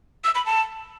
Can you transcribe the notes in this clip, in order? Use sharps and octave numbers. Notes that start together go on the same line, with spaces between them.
E6
B5
A5